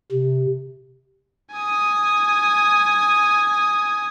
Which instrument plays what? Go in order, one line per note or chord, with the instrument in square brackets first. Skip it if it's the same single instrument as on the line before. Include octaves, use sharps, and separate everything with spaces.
[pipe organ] C3
[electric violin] G#5 D#6